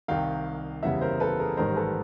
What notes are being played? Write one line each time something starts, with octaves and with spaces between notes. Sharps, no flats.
C2 C3 D#3 F5 G5
F#1 E2 C#3 E3 G3 E5 F#5
A#4 C5
A4 B4
G#4 A#4
A1 G#2 D#3 G3 A#4 C5
A4 B4